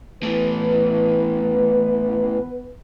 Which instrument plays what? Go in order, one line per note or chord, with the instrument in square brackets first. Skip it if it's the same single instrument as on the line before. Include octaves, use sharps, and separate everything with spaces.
[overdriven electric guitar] A2 E3 [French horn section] B3 B4